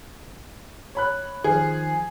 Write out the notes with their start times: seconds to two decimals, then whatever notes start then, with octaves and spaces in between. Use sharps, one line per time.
0.95 C#5 B5 F#6
1.44 D#3 F3 G#4